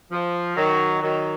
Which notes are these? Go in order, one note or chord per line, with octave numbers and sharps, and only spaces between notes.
F3
D#3 F#3
D#3 F#3